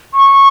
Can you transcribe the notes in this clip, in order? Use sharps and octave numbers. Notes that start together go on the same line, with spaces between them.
C#6